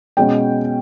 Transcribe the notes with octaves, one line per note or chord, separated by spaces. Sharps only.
B2 G#3 C#4 G5